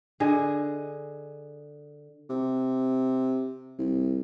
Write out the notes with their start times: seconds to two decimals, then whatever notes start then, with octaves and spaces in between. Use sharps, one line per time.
0.20 D3 G#4 D#5
2.30 C3
3.79 C2